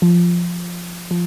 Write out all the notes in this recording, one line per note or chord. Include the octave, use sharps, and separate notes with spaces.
F3
F3